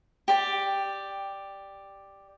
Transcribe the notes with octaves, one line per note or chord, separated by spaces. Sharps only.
G4 D5